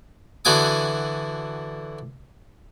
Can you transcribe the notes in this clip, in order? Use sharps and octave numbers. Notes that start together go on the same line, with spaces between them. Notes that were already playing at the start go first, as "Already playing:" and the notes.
D3 E3 F#4 G#5 D6 D#6